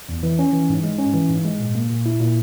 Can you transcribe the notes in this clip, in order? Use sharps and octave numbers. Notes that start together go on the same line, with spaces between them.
E2
E3
C#4
E3
G#2
G#3
C#4
E3
G#2
G#3
A#2
A#3
A#2
E4
A#2